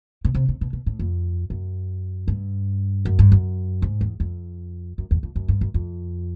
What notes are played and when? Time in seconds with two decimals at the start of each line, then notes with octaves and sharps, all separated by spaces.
0.25 B2
0.35 C3
0.49 C3
0.61 B2
0.73 B2
0.86 A2
0.99 F2
1.50 F#2
2.28 G2
3.05 F#2
3.19 G2
3.32 F#2
3.82 G#2
4.01 E2
4.20 F2
4.98 F#2
5.11 E2
5.23 F2
5.36 F#2
5.48 G2
5.61 F#2
5.74 F2